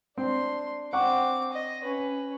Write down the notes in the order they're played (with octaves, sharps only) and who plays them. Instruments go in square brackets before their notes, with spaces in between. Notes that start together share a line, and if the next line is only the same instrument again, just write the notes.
[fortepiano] C4 [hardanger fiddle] D4 C6
[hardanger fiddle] C4 D6 [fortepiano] F#5 C#6
[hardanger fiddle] D#5
C#4 B4